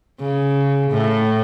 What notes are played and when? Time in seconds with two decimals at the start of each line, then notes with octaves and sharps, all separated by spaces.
0.20 C#3
0.91 A2